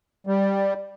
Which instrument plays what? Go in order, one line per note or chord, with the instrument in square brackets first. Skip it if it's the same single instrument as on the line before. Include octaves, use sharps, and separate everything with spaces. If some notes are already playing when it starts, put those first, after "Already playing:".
[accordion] G3